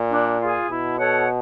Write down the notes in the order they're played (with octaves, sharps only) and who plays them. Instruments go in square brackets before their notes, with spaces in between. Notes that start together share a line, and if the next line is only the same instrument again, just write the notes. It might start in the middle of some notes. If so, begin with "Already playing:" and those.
Already playing: [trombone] A#2
[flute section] D4
F4 G#4
[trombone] B2 [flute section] E4
[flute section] A4 C#5 F#5